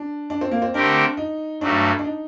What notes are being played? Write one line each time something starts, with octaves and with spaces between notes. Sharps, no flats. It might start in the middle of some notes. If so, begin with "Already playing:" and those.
Already playing: D4
D4
C4
A#3
C4
D3 A3 C4 D4 G4 A#4
D#4
G2 F#3 A3 D4
D4
D#4